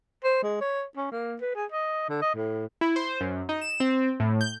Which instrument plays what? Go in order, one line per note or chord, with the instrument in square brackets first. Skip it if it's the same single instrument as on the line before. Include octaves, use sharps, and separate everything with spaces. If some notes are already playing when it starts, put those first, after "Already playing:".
[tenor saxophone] C5
G#3
C#5
C#4
A#3
B4
G#4
D#5
D3
D#5
A2
[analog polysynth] E4
C5
F#2
D#4
E7
C4
A2
G6